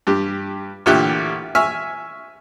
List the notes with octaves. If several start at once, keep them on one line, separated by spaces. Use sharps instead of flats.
G2 G4
A1 A#2 D3 G4 G5 F#6
E5 G#5 C#6 F6